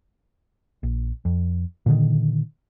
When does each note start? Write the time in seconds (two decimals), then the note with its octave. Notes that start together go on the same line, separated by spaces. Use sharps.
0.83 A#1
1.25 F2
1.86 A#2 D3 D#3